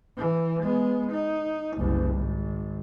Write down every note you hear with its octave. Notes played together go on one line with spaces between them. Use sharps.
E3
G#3 B3
D#4
F#1 C2
G#1